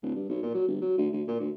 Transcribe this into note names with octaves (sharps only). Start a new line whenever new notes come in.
D1
G2
B1
A#2
F#3
G1
F#3
D2
D2
A#2
D2